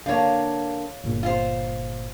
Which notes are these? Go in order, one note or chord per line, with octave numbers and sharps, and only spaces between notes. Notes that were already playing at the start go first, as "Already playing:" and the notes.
D3 A#3 C#5 F5
G1 A#2
F4 C5